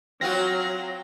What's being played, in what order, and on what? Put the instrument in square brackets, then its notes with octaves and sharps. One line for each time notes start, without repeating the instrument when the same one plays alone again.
[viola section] F#3 [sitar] C4 F4 F#4 [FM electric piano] A#6